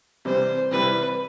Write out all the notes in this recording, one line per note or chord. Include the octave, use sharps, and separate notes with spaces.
C3 E3 G3 C4 E4 C5
C3 E3 G3 C4 E4 B4